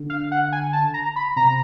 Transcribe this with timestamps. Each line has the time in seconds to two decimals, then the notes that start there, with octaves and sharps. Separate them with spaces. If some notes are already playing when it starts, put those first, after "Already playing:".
Already playing: D3
0.10 F5
0.32 F#5
0.52 G#5
0.73 A5
0.94 A#5
1.16 B5
1.36 C3 A#5